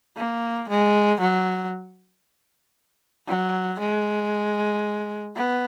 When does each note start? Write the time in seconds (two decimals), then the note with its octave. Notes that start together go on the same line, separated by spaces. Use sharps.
0.17 A#3
0.69 G#3
1.20 F#3
3.28 F#3
3.79 G#3
5.36 B3